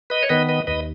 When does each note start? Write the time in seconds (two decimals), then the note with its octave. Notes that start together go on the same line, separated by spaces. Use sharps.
0.10 B4 D#5
0.23 C#5
0.29 D#3 B3 B4 D#5
0.49 B4 D#5
0.67 D#2 B4 D#5